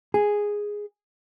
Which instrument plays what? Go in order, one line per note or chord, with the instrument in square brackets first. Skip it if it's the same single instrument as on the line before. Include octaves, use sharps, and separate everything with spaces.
[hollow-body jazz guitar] G#4